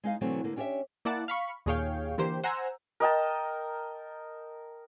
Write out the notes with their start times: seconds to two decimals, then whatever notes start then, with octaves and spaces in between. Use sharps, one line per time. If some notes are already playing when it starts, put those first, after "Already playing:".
0.04 G#3 D#4 F5
0.21 B2 D3 E3 F#3 A3 C4
0.44 D3 A#3
0.56 C#4 D4 G4 G#4 C#5 E5
1.05 A#3 E4 D5 F#5 A5
1.28 F5 B5 C#6
1.66 D#2 A#2 G#4 C#5 F5 G5
2.18 D3 E3 A#3 G4 C5
2.44 C5 F#5 G#5 A#5 E6
3.00 A#4 D#5 G5 A5